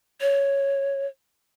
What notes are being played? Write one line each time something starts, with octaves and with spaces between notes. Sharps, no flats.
C#5